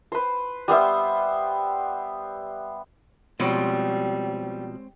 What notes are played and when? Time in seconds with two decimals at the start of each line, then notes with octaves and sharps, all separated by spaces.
0.12 B4 C5
0.68 G3 B3 C5 E5
3.40 B2 F3 G3 G#3 C4 C#5